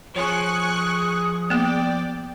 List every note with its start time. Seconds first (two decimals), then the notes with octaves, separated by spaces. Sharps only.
0.16 F3 G#4 C#5 G#5 C#6 D#6 F#6
1.50 A#3 B3 D5 G5